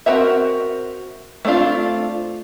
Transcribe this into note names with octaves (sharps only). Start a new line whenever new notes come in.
C4 C#4 F#4 A#4 E5
A3 B3 C4 D4 F4